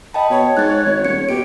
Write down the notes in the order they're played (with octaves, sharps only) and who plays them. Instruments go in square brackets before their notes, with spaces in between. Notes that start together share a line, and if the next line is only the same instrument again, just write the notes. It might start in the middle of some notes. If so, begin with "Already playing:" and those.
[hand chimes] D#5 G5 A5 [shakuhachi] B5
[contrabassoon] B2 [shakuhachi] C#5
[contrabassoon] G#2 [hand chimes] F#6 A6
[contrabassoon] G#1
[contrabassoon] D#1 [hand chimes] C#7
[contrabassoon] B2 [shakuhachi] G4 [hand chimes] D7